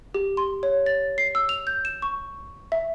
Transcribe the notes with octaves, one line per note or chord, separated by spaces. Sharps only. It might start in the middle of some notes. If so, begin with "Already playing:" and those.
G4
C6
C#5
A6
C7
E6
F7
G6
E7
C#6
E5